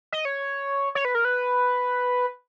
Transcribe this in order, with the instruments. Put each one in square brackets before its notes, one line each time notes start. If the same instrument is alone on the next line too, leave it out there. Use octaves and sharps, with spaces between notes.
[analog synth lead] D#5
C#5
C#5
B4
A#4
B4